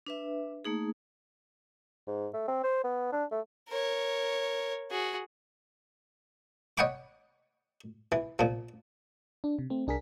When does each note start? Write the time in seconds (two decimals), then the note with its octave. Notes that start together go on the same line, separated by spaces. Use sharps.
0.07 D4 B4 E5
0.65 A3 A#3 D#4 G#4
2.07 G#2
2.34 A3
2.48 C4
2.64 C5
2.84 B3
3.12 D4
3.31 A3
3.69 A#4 C#5
4.91 F#4 G#4
6.78 C#5 D#5 F#5 G5 B5 D6
8.12 E3
8.39 A#2 F3
9.44 D4
9.59 C3
9.70 A3 C4
9.87 C2 D4 G#4 A#4 B6